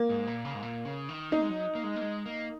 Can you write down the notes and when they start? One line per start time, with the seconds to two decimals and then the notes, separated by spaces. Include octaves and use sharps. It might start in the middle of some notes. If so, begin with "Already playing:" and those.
Already playing: A#3
0.10 G#2
0.27 A#2
0.45 C#3
0.54 G#2
0.63 A#2
0.85 C#3
1.09 D#3
1.31 A#3 D#4
1.42 G#3
1.49 F#3
1.75 A#3
1.84 G#3
1.96 A#3
2.01 G#3
2.26 A#3